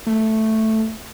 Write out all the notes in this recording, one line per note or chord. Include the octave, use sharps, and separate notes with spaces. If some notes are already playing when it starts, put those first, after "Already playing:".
A3